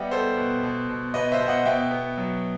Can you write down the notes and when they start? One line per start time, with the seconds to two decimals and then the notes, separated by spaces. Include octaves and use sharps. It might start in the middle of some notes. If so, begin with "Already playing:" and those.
Already playing: G3 B3 D#5 E5 F#5 G5
0.11 B3 A4 C5
0.37 B2
0.63 B2
0.89 B2
1.14 B2 B4 D#5
1.32 C5 E5
1.40 B2
1.48 D#5 F#5
1.66 B2 E5 G5
1.91 B3
2.18 F#3